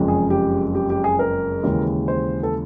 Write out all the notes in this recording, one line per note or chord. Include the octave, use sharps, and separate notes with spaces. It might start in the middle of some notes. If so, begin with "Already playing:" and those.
Already playing: F#1 F2 C#3 F3 G#3
G#4
G4
G4
G4
G#4
A#4
D#2 C#3 E3 G#3
C5
A4